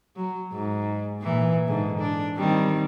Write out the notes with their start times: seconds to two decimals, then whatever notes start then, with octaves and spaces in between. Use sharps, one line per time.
0.16 F#3
0.52 G#2
1.21 A#2 E3
1.66 G#2 D3
1.98 D4
2.36 D#3 G3 C4